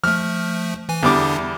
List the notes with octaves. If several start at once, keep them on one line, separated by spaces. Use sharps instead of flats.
F3 A3 F6
E3 G#5
E2 D3 G3 B3 D4 D6